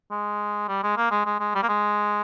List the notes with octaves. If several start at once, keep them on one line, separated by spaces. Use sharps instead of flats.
G#3
G3
G#3
A#3
G#3
G#3
G#3
G3
A#3
G#3